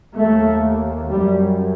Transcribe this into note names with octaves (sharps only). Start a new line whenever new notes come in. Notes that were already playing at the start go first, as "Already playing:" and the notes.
D#2 A3
F#2 G3